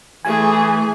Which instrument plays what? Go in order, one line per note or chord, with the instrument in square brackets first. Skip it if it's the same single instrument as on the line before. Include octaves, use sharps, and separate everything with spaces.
[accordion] E3 [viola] A3 G#4 [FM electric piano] G#5